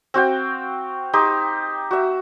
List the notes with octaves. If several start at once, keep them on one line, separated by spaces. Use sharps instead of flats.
C4 F#4 F5 G5
D#4 G4 C6 E6
F#4 E5